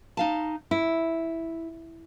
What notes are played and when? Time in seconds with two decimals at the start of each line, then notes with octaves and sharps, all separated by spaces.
0.17 D#4 F5 A5
0.71 E4